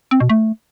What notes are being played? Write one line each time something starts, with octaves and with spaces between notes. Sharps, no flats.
C4
B2
A3